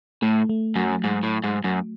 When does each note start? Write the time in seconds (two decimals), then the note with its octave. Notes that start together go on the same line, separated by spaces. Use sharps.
0.22 A2 A3
0.49 A3
0.76 F#2 F#3
1.04 G#2
1.23 A2
1.44 G#2
1.64 F#2